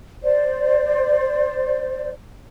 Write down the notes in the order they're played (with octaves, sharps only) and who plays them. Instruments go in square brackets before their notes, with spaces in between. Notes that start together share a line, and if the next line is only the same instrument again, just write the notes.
[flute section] C5 D5